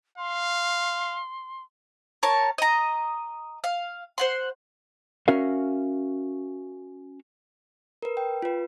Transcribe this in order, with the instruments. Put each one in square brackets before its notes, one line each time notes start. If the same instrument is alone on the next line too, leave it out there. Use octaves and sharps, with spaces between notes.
[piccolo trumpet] F5 [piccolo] C6
[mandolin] A#4 C#5 A5
D#5 A#5
F5
C5 F#5 C6
[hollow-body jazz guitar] C#4 F#4 A#4 E5 F5
[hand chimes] A#4 B4
G5
F4 B4